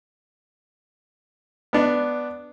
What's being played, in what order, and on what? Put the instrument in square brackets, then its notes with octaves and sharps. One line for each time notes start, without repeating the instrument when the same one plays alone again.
[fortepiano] B3 D4